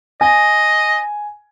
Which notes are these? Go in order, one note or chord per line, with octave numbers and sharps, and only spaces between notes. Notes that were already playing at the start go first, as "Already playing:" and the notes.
D#5 G#5